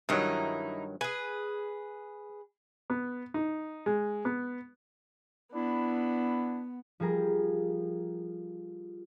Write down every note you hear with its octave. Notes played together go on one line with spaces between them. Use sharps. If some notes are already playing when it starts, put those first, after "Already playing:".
G2 D#3 F#3 D#4 E4
G#4 B4 G#5
B3
D#4
G#3
B3
B3 D4 E4
F3 G3 G#4 A#4